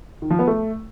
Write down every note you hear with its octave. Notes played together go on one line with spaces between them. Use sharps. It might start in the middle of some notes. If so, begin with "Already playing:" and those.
D#3
F3
B3
A3